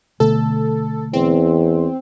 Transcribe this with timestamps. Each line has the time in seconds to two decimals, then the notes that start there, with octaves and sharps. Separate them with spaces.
0.20 B2 D3 A3 A4
1.13 E2 C4